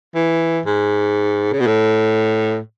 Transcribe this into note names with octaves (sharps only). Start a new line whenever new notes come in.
E3
G#2
C#3
B2
A2